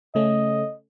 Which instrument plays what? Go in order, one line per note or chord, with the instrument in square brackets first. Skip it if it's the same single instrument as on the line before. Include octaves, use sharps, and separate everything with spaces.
[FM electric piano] C#3 A3 C#4 [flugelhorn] D#5